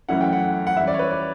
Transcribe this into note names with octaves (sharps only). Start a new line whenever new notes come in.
F#2 E3 A3 C#4 E4 F#5
G5
F#5
F#5
E3 G3 C#4 E5
D5
C#5
B4
D5